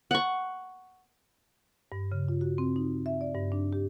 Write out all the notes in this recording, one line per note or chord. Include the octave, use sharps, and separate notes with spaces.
F#5 C#6
G2
C#3
F4
F#4
C4
D#4
E5
D5
G2
D4
G4